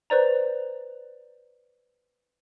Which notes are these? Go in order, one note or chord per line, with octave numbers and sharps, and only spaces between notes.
B4 C5 D5 A#5